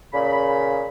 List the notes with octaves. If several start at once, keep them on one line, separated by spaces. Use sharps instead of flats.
A#2 C#3 B5